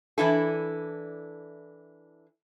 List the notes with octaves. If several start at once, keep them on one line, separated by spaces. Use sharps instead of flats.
E3 D4 E4 A4